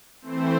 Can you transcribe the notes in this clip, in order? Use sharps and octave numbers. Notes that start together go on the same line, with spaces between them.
E3 A3 C4 C5